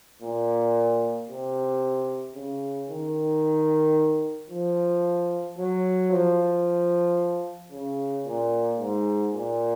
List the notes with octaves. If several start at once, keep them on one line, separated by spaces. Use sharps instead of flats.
A#2
C3
C#3
D#3
F3
F#3
F3
C#3
A#2
G#2
A#2